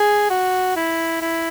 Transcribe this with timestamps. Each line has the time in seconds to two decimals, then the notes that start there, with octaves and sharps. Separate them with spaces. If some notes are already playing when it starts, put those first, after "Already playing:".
Already playing: G#4
0.30 F#4
0.76 E4
1.21 E4